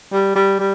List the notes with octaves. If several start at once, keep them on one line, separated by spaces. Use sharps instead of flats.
G3
G3
G3